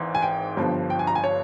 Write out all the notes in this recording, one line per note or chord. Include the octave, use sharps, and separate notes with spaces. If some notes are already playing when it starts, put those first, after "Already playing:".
Already playing: G#1 G#2 E3
G#5
G5
G1 G2 F3
G5
G#5
A#5
G#5
C#5